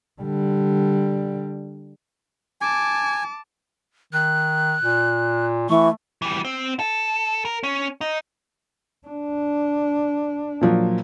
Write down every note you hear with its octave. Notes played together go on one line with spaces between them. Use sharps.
D3 G3
G#5 A5 D6
D#3 F#6
A#2
E3 A3 C#6
E3 G3
C4
A4
A#4
C#4
D#4
D4
A#2 F3 F#3